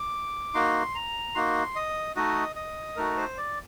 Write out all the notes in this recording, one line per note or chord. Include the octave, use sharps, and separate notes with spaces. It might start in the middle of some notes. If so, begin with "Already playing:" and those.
Already playing: D6
A#3 D#4 F#4 C6
A#5
A#3 D#4 F#4 C6
D#5
A3 D#4 F#4 D#5
D#5
A3 D#4 F#4 A#4
C5
D5